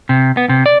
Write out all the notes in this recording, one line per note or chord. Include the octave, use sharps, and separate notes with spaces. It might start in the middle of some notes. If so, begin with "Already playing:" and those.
C3
B3
C3
D5